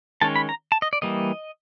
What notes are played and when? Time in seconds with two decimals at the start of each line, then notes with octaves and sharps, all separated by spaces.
0.22 D#3 G#3 C#4 A5
0.36 B5
0.49 A#5
0.72 A5
0.82 D#5
0.93 D5
1.02 E3 G3 A#3 D#5